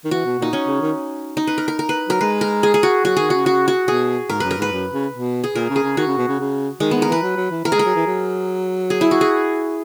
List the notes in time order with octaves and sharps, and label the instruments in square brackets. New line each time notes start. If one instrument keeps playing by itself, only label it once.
[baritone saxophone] D#3
[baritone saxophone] E3 [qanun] F#4
[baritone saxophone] B2
[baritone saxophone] A#2 [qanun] D#4
[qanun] C#4
[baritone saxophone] C#3
D#3
[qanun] D#4
B4
A#4
A#4
A#4
B4
[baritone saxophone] F#3 [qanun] A#4
[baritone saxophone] G#3 [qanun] B4
[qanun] A#4
G#4
G#4
F#4
[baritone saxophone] F#3 [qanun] F#4
[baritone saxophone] D#3 [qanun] G#4
[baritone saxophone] C#3 [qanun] F#4
[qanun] F#4
F#4
[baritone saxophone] B2 [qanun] G#4
[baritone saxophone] G#2 [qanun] A#4
[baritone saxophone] F#2 [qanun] B4
[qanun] A#4
[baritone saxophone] G#2 [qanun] B4
[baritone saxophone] F#2
C#3
B2
[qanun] G#4
[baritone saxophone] A#2 [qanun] A#4
[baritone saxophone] C#3
[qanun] G#4
[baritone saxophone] C#3
[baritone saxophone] D#3 [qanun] F#4
[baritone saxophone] C#3
B2
C#3
C#3
[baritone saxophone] D#3 [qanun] G#3
[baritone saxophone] D#3 [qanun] B3
[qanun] A#4
[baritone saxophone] E3 [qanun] B4
[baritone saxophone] F#3
F#3
E3
[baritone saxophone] E3 [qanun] A#4
[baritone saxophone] G#3 [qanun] G#4
[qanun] A#4
[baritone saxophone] F#3
E3
F#3
[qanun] G#4
E4
F#4
G#4